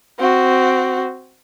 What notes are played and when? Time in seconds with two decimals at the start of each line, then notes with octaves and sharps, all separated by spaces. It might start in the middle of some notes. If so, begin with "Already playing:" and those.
0.19 C4 F#4